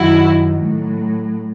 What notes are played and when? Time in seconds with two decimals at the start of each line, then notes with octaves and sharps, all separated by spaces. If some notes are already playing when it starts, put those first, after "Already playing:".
Already playing: F#2 D#3 F#3 E4 F#4
0.60 A2 F#3